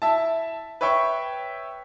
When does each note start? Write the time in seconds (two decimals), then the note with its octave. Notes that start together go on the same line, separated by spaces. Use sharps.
0.02 E4 E5 A5
0.81 B4 C#5 E5 G5 C#6